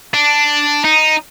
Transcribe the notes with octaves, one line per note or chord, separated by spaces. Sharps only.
D4
D#4